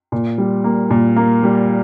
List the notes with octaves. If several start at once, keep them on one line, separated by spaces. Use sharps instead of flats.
A#2
G3
A#3
A#2
A#3
G3